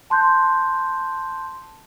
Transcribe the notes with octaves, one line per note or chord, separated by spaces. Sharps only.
A5 C6 F#6 G6